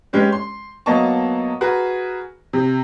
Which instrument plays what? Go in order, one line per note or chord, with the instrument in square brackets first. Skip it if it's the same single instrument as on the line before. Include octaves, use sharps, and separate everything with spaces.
[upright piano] G#3 C#4 G4 B4
C6
F#3 A#3 B3 D#5 A5 C#6
F#4 G#4 A#4 B4
C3